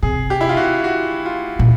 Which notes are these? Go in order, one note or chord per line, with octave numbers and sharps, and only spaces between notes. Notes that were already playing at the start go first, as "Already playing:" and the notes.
C3 G#4
G4
E4
F4
F#4
F#4
F4
A#2